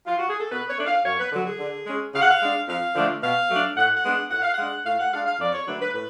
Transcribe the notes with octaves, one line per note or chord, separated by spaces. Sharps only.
F4
F#4
G#4
A4
B2 B4
C#5
A3 D4
F5
F#2 C#5
B4
D3 F#3
G#4
D3
G#3 C#4
C#3 F5
F#5
F5
G#3 D4
F2 F5
D3 F3 A3 D4
B2 F5
F#3 A3 D4
A2 F#5
F#5
G#3 B3 D4
A2 F#5
F5
F#5
G#3 D4
A2 F5
F#5
G#3 D4 F5
F5
F2 D5
C#5
D3 F#3 A3 D4 B4
B4
A2 B4